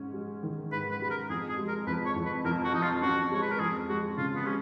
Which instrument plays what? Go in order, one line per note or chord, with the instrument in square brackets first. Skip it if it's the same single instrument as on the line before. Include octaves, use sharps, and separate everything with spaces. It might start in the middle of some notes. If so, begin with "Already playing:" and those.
Already playing: [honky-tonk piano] G#2 C#4
G#3
D#3
[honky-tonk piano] G#2 [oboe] B4
[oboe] B4
[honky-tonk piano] G#3 [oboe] B4
[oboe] A#4
[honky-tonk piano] F2 [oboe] G#4
[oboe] G#4
[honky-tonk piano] G#3
[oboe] A#4
[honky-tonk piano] F2 [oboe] B4
[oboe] C#5
[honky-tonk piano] F2
[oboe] B4
[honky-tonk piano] F2 [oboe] A#4
[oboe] F#4
[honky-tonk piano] F2 [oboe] D#4
[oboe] F4
[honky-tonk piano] C#4 [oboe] F#4
[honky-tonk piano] G#3 [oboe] C#5
[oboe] B4
A#4
[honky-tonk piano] F2 [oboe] G#4
[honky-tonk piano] G#3 [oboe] F#4
[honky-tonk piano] C#3 [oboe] F4
[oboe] B3
[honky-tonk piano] G#3 [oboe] C#4